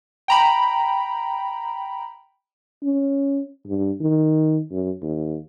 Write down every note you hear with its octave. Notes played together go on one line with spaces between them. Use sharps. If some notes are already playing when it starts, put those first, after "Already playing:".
G5 A#5 B5
C#4
G2
D#3
F#2
D#2